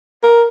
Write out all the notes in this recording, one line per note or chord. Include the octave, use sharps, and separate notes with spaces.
A#4